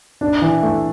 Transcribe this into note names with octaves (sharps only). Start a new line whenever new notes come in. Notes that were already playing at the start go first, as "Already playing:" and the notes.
D4
E3
A3